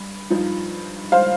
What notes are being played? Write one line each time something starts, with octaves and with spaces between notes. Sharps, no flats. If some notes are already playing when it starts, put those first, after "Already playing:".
Already playing: G2
G2 F3 D#4
C5 F5